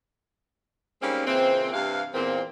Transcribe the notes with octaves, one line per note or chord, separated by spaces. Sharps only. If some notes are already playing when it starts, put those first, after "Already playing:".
G3 G#3 A#3 C4 C#4 D#4
A#2 C#3 E3 C4
G2 C3 E3 F5
E2 A#2 C4